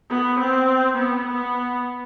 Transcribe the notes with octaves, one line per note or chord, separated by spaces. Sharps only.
B3
C4
B3
B3